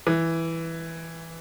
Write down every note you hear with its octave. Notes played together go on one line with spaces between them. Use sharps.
E3